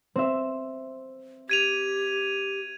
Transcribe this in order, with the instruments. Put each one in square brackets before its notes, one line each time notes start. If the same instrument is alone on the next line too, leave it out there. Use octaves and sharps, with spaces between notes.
[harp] C4 E5
[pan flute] G4 [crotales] G#6 D#7 F7